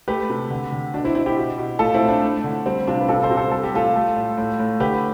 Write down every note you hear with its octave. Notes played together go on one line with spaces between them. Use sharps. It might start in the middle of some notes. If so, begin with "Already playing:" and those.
A3 G4 B4
C3
D3
D3
B2 D4
C4 E4
B2 C4 E4
E4 G4
B2
B2
A2 F4 A4
C4 E4
A2
D4
A3
D3
G3 C4
C3 D4 F4
B4
C3 F4 A4
A4 C5
C3
A4 C5
G3 A4
G4
A2 F4 A4
A3
A2
A2
A2
D3 G4 B4